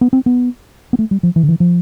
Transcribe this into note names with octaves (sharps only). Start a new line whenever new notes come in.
B3
C4
B3
B3
A3
G3
F3
E3
D3
E3
F3